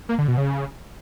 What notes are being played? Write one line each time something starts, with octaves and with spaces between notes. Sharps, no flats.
A#3
D3
B2
C#3